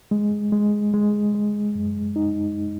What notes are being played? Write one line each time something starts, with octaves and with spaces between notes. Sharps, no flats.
G#3
G#3
G#3
G#3
F#2
D#4